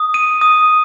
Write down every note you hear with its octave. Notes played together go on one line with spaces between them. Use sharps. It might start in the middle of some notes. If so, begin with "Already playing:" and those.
Already playing: D#6
D#7
D#6